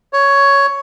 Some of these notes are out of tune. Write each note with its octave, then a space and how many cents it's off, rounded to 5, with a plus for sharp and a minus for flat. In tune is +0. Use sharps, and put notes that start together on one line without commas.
C#5 +10